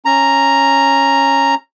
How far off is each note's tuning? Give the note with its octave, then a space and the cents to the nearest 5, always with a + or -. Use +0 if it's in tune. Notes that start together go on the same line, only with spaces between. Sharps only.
C#4 -10 A#5 +0